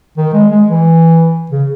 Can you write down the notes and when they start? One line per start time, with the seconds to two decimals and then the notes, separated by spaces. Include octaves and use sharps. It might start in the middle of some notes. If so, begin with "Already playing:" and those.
0.17 D#3
0.34 G#3
0.51 G#3
0.68 E3
1.51 C#3